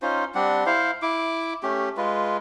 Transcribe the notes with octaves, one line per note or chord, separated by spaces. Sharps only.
C#4 D#4 F4 C5
G3 C4 D4 F#5
E4 C5 F5
E4 D6
A3 C#4 G4
G#3 F4 B4